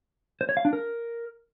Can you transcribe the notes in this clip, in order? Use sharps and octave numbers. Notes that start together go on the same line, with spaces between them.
C5
C#5
F5
D4
A#4